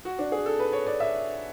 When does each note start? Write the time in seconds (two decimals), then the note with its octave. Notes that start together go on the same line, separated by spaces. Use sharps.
0.05 F#4
0.19 D4
0.32 G#4
0.46 A4
0.59 B4
0.73 C#5
0.87 D5
1.00 E5